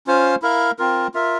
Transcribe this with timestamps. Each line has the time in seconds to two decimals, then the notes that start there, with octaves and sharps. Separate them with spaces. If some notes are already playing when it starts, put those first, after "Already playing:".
0.07 C#4 F4 C5 F5
0.42 E4 A#4 F5
0.79 C4 F4 A#4
1.14 F4 A#4 E5